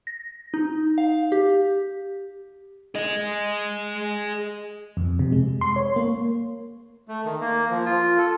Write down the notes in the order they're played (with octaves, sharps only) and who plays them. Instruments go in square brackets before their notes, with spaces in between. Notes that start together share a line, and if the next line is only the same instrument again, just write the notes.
[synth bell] A#6
D#4
F5
G4
[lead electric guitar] G#4 D#5
[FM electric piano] F2
C3
G#3
C6
C#5
A#3
[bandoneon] A3
D#3
A#3
F3
F4
A4